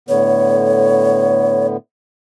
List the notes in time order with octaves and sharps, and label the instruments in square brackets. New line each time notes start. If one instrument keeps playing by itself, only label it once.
[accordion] A2 D3 B3 [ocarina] C#5